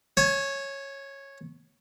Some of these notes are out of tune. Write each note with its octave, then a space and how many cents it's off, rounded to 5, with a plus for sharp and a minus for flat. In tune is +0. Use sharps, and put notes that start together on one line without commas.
C#5 -10 G#5 +35